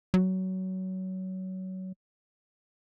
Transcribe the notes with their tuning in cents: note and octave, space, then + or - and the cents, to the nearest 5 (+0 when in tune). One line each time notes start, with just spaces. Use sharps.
F#3 +20